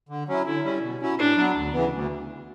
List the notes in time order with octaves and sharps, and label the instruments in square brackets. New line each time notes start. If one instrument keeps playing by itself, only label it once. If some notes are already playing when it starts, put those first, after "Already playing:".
[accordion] D3
F#3 C#4 E4
[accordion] D3 [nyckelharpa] E4
[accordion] G3 C#4
B2
F#3 C#4 E4
[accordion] A2 [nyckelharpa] D4
[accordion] F#3 B3
D2
C#3 E3 B3
D2